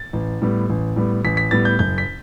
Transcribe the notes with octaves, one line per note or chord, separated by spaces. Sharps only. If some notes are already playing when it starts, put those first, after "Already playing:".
Already playing: A6
A1
A2 G3 B3
A1
A2 G3 B3
A1 B6
B6
A2 G3 B3 A6
G6
F#1 G6
B6